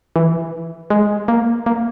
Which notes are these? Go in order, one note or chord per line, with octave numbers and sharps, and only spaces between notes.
E3
G#3
A#3
A#3